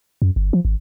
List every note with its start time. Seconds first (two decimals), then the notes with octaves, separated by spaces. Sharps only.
0.22 F#2
0.36 G1
0.53 F3
0.65 G#1